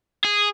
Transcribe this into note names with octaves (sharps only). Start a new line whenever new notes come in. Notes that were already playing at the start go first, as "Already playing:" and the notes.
G#4